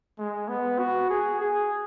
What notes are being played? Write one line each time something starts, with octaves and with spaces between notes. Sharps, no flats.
G#3
B3
F#4
G#4
G#4